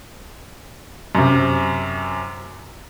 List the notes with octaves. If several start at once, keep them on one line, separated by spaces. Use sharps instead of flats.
F#2 C3